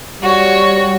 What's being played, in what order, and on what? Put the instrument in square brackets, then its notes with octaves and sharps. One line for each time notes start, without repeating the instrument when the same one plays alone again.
[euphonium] G3 [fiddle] F#4 C#5